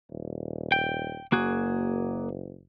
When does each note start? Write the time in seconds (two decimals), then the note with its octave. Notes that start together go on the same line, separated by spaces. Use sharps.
0.10 D#1
0.72 G5
1.32 F#1 A#3 F#4 G#4